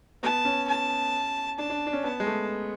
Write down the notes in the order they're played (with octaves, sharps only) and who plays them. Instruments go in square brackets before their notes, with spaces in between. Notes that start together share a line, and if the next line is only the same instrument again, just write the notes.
[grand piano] B3 [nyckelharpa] A5
[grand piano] C#4
[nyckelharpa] A5
[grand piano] D4 [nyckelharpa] A5
[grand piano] D4
D4
C#4
[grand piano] B3 [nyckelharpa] A5
[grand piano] G#3
A3